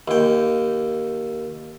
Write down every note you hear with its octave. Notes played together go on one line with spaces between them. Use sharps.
D#2 G5